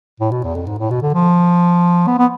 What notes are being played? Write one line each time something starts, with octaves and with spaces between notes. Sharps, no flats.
A2
B2
E2
F2
G#2
A2
B2
D3
F3
B3
B3